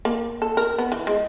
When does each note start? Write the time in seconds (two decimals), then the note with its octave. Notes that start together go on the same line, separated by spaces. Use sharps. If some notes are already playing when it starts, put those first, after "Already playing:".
0.05 A#3
0.42 A4
0.57 A#4
0.78 B3
0.92 E3
1.07 G#3